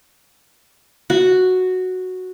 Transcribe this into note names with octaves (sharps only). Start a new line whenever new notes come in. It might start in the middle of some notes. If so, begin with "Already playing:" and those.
F#4